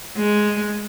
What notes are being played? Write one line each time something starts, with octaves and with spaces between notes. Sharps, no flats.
G#3